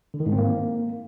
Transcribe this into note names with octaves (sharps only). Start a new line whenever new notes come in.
D3
D#3
G#2
C4
A#3